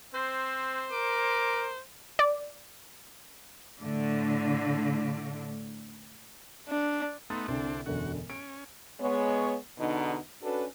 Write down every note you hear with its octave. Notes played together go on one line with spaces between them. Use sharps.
C4 C5
A#4 D6
D5
A2 D3 A3
D4
A3 B3 D#4 C6 A6
C2 D3 C4 D4
E1 F#2 D3 F#4
C#4 D7
G#3 B3 C#5
E2 B2 D3 D#4
C#4 D4 F#4 A4 B4